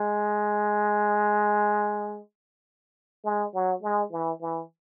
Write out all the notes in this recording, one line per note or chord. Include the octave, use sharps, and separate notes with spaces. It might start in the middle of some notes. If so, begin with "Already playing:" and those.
Already playing: G#3
G#3
F#3
G#3
E3
E3